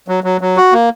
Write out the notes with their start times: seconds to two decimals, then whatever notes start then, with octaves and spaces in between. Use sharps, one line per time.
0.08 F#3
0.24 F#3
0.41 F#3
0.57 F#4
0.73 A#3